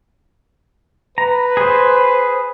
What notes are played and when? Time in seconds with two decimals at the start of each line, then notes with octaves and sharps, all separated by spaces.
1.18 B4 A#5
1.57 G#4 C5